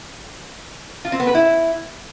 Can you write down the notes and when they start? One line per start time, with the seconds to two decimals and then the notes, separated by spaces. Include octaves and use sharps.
1.05 F4
1.12 C4
1.20 B3
1.27 B4
1.35 E4